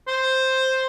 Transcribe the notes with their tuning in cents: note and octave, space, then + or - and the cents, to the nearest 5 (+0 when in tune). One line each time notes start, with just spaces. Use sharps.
C5 +5